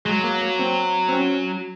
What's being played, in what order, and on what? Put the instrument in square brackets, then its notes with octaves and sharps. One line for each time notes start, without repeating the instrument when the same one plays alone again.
[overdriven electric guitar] F#3 [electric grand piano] G#3
[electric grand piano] A#3
A#3
C4
C4
C#4